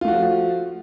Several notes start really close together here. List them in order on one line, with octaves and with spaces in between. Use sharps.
F4 A3 F#4 F3